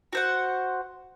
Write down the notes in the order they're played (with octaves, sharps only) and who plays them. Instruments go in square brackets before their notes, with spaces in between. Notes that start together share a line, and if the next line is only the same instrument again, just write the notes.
[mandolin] F#4 C5 F#5